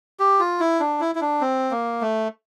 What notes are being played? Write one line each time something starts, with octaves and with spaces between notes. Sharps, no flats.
G4
F4
E4
D4
E4
E4
D4
C4
A#3
A3